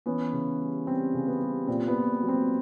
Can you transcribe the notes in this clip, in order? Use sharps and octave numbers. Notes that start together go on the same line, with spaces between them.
E3 B3 C#4
C#3
G3
G3 C4
C#3
B3
G3
A#2 C4
B3
A#2
F#3
C4